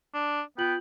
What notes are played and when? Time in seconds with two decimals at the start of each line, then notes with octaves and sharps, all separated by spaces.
0.14 D4
0.58 B3 F4 G5 F#7